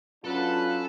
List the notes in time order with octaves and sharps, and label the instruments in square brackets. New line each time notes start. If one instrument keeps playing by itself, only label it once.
[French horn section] F#3 F4 [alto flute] C#4 [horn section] D4 B4 [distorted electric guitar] A4